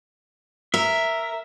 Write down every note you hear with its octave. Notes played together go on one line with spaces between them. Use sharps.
A#4 E5